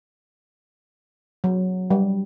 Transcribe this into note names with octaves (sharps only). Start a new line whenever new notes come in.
F#3
G3